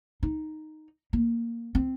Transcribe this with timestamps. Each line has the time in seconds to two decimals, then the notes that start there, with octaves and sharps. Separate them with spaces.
0.23 D#4
1.13 A#3
1.75 C4